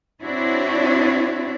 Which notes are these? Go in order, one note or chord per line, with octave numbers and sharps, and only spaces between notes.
C4 D4 E4 F#4 C#5